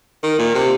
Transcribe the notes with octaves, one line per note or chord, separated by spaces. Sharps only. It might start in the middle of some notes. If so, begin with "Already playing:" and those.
D#3
A#2
C3